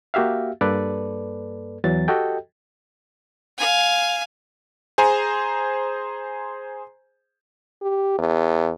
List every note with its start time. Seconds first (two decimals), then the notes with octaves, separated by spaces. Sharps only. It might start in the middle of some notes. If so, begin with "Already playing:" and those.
0.14 A#3 F#4 G4 E5 F5
0.61 G2 A#3 A4 B4 D5
1.84 E2 E3 F#3 A6
2.08 F#4 G4 A4 D#5 G5
3.58 F5 G#5
4.98 G#4 C5 G#5 A#5
7.82 G4
8.18 E2